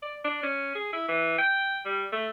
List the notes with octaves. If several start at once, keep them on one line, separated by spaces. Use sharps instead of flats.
D5
D4
C#4
G#4
E4
E3
G5
G3
A3